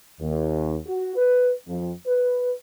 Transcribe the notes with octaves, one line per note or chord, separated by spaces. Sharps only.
D#2
F#4
B4
F2
B4